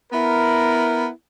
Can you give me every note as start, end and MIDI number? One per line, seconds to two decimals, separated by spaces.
0.13 1.08 59
0.13 1.08 64
0.13 1.08 70